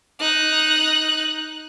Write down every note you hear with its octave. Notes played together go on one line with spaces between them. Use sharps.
D#4 F#6